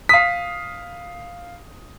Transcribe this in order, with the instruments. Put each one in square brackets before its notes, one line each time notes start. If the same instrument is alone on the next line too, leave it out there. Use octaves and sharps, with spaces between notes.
[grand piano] F5 D#6 [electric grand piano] B6